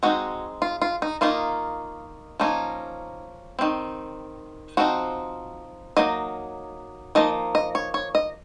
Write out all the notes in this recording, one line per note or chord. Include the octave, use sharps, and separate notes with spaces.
G#3 C4 D#4 F#4
F4
F4
D#4
D#3 A#3 D#4 F4
F3 A#3 C#4 D#4
D#3 F#3 C4
F3 C4 D#4 F#4
F#3 A#3 D#4 D#5
F3 A#3 D#4 D#5
D#5
C#5
C#5
D#5